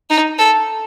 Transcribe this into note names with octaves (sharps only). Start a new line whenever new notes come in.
D#4
A4